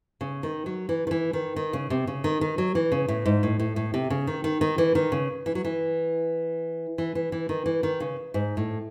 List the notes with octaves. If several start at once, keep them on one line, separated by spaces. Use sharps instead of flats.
C#3
D#3
F#3
E3
D#3
E3
D#3
D#3
C#3
C3
C#3
D#3
D#3
F#3
E3
C#3
A2
G#2
A2
A2
A2
C3
C#3
D#3
D#3
D#3
E3
D#3
C#3
E3
F#3
E3
E3
E3
E3
D#3
E3
D#3
C#3
G#2
A2